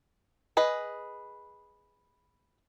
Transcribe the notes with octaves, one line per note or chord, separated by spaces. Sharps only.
G#4 B4 D#5